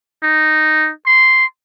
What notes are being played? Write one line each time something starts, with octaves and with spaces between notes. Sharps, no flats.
D#4
C6